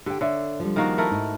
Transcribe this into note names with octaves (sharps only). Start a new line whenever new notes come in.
D3 G4 G5
D3 C#5 D5 E5
F3 G3
D#3 A#3 F#4
A3 E4 A#4
G#2 D#4